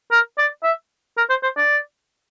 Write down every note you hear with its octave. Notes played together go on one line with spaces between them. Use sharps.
A#4
D5
E5
A#4
C5
C5
D5